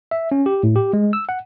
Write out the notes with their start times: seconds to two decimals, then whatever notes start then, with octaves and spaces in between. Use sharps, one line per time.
0.11 E5
0.32 C#4
0.46 G4
0.63 A2
0.76 G4
0.93 G#3
1.13 E6
1.29 F#5